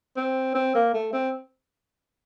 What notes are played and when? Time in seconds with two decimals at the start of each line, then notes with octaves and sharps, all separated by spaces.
0.17 C4
0.55 C4
0.75 A#3
0.94 A3
1.13 C4